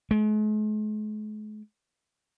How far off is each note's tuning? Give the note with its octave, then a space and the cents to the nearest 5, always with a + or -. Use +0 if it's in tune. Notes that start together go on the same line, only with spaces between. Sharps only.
G#3 +45